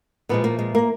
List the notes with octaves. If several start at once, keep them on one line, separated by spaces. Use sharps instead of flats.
A#2 F3 G#3 B3
A#3
G#3
A#3